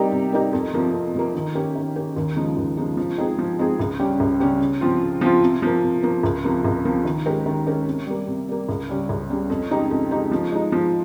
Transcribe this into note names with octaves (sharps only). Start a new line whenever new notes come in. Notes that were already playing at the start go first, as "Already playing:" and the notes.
Already playing: C3 G3 A#3 D#4 G4
C3
G3 A#3 D#4 G4
F2
C3 F3 A#3
F2
C3 F3 A#3
D#3
A#3 C#4 G4
D#3
A#3 C#4 G4
D#2
C#3 F3 G#3 D#4
D#2
C#3 F3 G#3 D#4
F3
G#3 C4 D#4 G#4
F3
G#3 C4 D#4 G#4
C#2
C#3 G3 C#4 G4
C#2
C#3 G3 C#4 G4
C#3
F3 C4 F4
C#3
F3 C4 F4
C3
F3 A#3
C3
F3 A#3
C#2
C3 F3 A#3
C#2
C3 F3 A#3
D#3
G#3 C#4 G4 A#4
D#3
G#3 C#4 G4 A#4
C3
G3 A#3
C3
G3 A#3
C#2
C#3 G3 C#4
C#2
C#3 G3 C#4
F2
C#3 G#3 D#4 G4
F2
C#3 G#3 D#4 G4
F3
G#3 D#4
F3